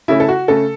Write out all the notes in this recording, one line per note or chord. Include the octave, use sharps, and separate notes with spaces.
C#3 A3 C#4 E4
A4
F#4
C#3 A3 C#4 A4